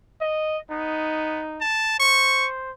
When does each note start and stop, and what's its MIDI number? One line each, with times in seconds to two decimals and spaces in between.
0.21 0.59 75
0.71 1.42 59
0.71 1.61 63
1.61 1.97 81
2.00 2.71 72
2.00 2.48 85